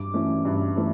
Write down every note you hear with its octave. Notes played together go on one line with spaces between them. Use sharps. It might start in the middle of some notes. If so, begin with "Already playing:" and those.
Already playing: G2 D6
E3 A3 C#4
G2
E3 A3